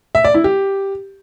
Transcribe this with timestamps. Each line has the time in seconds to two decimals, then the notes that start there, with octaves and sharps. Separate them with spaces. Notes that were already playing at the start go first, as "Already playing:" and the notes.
0.15 E5
0.25 D5
0.34 E4
0.44 G4